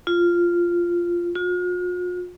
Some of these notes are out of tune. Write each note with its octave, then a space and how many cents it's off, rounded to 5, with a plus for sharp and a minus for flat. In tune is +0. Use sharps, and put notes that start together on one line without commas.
F4 -5
F4 +45